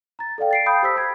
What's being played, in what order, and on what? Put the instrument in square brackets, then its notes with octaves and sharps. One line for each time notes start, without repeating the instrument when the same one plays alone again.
[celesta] A#5 A6
A4 D5 F5 G5
A6 C7 D7
F5 G5 A5 B5 D#6 G6
G4 C5 E6 B6
B5 G#6